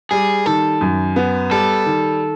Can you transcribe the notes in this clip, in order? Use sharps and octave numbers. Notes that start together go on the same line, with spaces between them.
G3 G#4
D#3 A4
F#2
B3
G3 A4
D#3